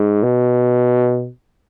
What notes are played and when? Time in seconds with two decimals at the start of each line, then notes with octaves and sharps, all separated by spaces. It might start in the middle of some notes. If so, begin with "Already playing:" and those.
Already playing: G#2
0.23 B2